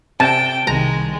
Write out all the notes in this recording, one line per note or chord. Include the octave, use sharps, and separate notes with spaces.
C3 G5 A5
C2 D#3 G#3 A#5